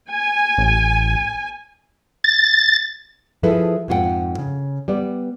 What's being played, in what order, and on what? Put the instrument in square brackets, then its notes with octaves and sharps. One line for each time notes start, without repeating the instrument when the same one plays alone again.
[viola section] G#5
[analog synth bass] A1
[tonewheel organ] A6
[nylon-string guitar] F3 E4 G#4 A4 B4
F2 G#2 F4 F#4 F#5 G5
C#3
G3 B3 D5